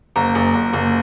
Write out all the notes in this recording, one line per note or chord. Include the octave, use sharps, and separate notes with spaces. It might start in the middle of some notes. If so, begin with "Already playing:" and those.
F#1 A#5
F#1
F#1
F#1